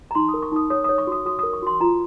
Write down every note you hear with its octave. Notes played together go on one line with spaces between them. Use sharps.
A#5
D#4 C6
D#6
A#4
C#6
D#4 D#6
C#5 D#6
D#6
C#5
C#6
F#4 D#6
F#4 D#6
D#6
A#4
C#6
F#4 C6
F4 A#5